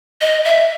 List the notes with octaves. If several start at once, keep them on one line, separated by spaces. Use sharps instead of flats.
D#5
E5